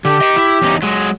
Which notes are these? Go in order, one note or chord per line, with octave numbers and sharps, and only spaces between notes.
D3 G4
D#5 G5
E4
E2 C#4 D#4
F#3 G#3